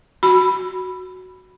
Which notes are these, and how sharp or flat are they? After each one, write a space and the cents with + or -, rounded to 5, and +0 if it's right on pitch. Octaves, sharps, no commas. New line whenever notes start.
F#4 +0 B5 +0